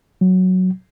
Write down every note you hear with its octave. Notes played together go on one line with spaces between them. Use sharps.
F#3